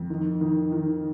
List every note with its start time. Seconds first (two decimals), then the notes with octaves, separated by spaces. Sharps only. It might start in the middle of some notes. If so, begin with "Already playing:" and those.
Already playing: F2
0.10 D#3
0.41 D#3
0.72 D#3